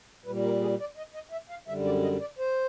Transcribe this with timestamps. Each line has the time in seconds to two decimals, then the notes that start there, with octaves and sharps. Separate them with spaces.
0.26 A#2 G3 B4
0.44 A#4
0.61 G#4
0.80 D5
0.97 D#5
1.14 D#5
1.32 E5
1.50 F5
1.68 F#2 D3 G3 E5
1.85 D5
2.03 D#5
2.20 D5
2.38 C5